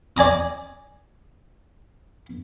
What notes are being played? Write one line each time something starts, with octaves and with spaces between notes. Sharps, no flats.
D5 G#5 A#5 D#6